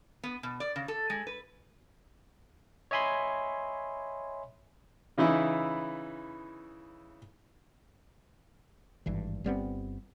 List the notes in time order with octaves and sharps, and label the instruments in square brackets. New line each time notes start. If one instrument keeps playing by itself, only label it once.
[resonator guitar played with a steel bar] B3
B2
D5
C#3
A4
G#3
B4
[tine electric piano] C#5 D#5 E5 G#5 B5 C6
[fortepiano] C#3 E3 D#4 E4
[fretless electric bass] G#1 G2 E3
G1 G3 B3 C4